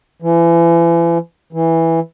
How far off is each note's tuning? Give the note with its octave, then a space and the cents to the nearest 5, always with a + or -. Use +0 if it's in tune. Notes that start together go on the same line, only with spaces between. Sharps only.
E3 +35
E3 -5